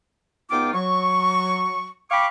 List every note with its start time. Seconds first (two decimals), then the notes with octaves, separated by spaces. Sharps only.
0.51 C#2 B3 D#4 F4 G5 D6
0.74 F#3 C#6
2.11 F5 G5 B5 C#6 D6